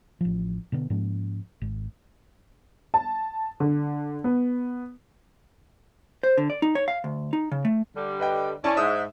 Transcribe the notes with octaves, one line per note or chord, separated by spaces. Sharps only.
A1 F3
B2 D3 B3
G#2 F3 A#3 C#4
G#1
A5
D3
B3
C5
D3
D5
D#4
C#5
F5
D2
D#4
C#3
A3
D3 G3
B4 D#5 G5
C#4 E4 D5 A5
G#2 E5 D#6